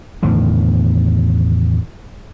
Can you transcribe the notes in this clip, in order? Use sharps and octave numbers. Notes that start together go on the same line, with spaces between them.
E2 A2 D3 D#3